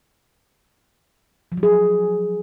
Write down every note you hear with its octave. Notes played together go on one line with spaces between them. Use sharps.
F3
F#3
G#4